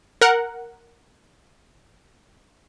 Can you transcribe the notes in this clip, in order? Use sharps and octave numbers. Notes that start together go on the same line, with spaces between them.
A#4 F#5